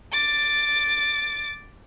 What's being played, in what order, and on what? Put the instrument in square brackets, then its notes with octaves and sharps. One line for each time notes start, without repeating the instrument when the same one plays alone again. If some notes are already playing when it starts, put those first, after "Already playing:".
[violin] D6 A6